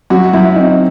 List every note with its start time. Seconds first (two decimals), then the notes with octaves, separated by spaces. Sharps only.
0.10 F#2 F#4
0.33 F#2 E4
0.56 C4 D#4